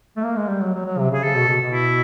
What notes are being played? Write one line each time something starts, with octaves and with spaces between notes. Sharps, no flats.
A3
A#3
G#3
G3
F#3
F#3
F#3
C3
C#3 G#4
C#3 A4
B2
B2
B2
E4